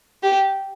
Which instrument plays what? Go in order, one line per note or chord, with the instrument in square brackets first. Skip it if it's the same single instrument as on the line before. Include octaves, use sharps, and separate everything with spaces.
[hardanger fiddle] G4